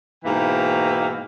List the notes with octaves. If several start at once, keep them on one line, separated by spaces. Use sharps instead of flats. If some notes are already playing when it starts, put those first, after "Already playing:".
G#2 B2 E3 A#3 G5